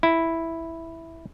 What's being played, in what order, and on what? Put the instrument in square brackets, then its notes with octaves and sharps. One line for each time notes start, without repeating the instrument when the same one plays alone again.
[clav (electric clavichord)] E4